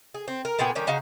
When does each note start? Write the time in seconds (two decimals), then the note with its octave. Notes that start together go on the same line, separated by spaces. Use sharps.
0.14 G#4
0.28 C4
0.45 A#4
0.59 A#2 B3 G#4 G5
0.75 D#3 G3 C#4
0.87 C#3 D#4 F#4 F5